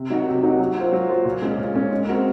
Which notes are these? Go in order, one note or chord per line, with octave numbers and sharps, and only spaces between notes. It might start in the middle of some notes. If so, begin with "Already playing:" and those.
Already playing: C3
F#3 A#3 D#4 F#4
C3
F#3 A#3 D#4 F#4
F#3
A#3 F4 C5
F#3
A#3 F4 C5
A#2
G#3 C#4
A#2
G#3 C#4
G#3
C4 F#4 A#4